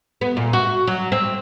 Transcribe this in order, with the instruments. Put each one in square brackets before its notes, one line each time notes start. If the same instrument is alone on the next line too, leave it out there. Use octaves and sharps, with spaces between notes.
[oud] B3
A#2
F#4
F#3
C4